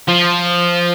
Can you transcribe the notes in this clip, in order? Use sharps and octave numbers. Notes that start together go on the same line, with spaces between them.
F3